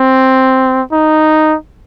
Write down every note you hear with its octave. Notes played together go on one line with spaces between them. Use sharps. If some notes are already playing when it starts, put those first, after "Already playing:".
Already playing: C4
D#4